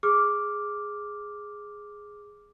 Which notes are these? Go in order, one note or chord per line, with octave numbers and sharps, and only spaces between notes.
G#4 D6 F6